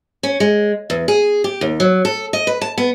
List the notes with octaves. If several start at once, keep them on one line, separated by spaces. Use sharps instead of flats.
C#4
G#3
E2
G#4
G4
D#2
F#3
A4
D#5
B4
A5
B3